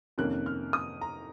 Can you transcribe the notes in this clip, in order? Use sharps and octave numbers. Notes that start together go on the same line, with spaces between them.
F2 C3 D#3 A#3 C#4 F#6
F6
D#6
A#5